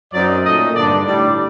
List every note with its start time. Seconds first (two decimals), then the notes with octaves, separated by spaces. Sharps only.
0.12 F#2 F#3 C4 D#4 D5
0.44 A#2 A3 D#4 D#5
0.75 G2 D3 G3 D4 D5
1.06 A2 G3 D4 D5